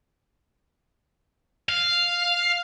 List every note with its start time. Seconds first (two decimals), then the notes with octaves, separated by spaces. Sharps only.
1.69 F5